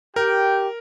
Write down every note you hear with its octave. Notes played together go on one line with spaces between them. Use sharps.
G4 A#4 G5